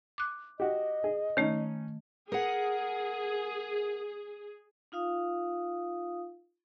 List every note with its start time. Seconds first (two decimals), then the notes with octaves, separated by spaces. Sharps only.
0.18 D6 F#6
0.60 F#4 G4 D#5
1.04 G#4
1.37 D#3 A3 C#4 D#4
2.32 G#4 A#4 F#5
4.92 D#4 F4 F5 D#6